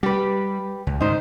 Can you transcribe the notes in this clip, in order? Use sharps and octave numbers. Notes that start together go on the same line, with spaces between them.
G3 G4 B4
C#2
D2 G#2 D#3 D#4 C5